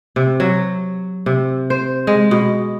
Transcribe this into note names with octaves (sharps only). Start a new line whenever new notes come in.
C3
F#3
C3
C5
G#3
B2